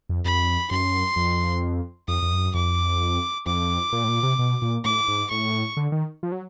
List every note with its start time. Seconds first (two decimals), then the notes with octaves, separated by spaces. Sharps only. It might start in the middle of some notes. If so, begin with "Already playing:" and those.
0.09 F2
0.25 F2 B5
0.71 F#2 C6
1.16 F2
2.08 F2 D#6
2.22 F2
2.32 F#2
2.54 F2 D6
3.46 F2 D6
3.93 A#2
4.04 A2
4.09 A#2
4.23 C3
4.39 B2
4.62 A#2
4.85 A2 D6
5.08 G#2
5.30 A2 C#6
5.77 D3
5.92 D#3
6.23 F3
6.32 F#3